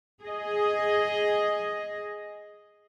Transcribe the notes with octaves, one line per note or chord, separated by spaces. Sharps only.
G#4 D#5